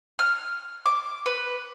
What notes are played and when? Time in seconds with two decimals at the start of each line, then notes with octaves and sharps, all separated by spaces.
0.19 F6
0.86 D6
1.26 B4